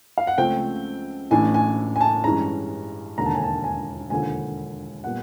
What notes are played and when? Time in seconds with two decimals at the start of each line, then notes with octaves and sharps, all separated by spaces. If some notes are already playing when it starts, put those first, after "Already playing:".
0.18 F5
0.27 F#5
0.38 C#2 C#3 F3 A3 C4 G5
1.31 A1 A2 E3 A3 D4 G#5
1.54 G#5
1.96 G#5
2.01 A5
2.24 G2 E3 G#3 C#4 A#5
3.18 E1 D#2 D3 A#5
3.26 A5
3.34 G#5
3.43 A5
3.64 G#5
4.10 E1 D#2 D3 F3 G#5
5.04 A#2 G3 B3 F#5